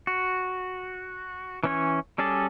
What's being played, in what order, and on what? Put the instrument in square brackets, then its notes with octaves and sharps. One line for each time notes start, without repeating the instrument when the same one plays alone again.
[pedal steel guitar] F#4
E3 C#4 C#5
G3 C#4 G#4 A4 D5